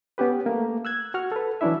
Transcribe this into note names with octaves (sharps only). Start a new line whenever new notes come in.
B3 C#4 G4 B4
A3 A#3
E6 F#6 G#6
F#4 F#5 F6
A4 B4
E3 F#3 C#4 D4 E4 E5